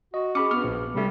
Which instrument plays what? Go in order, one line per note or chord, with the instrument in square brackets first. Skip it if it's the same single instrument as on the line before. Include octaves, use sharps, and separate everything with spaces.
[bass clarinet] F#4 [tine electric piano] D#5
[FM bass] C#4 [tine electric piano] G#4 B5 C#7 [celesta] D6
[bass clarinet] G2 [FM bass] B3 [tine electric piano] F6
[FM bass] A#1 [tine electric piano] A#2
[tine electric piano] C3 A3 [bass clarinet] G3